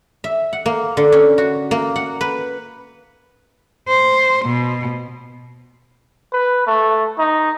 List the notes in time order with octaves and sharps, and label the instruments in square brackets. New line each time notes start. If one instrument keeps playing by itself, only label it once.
[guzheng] E5
F#5
A#3
D3
C#4
F#4
A#3
F#5
B4
[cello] C5
B2
[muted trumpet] B4
A3
D#4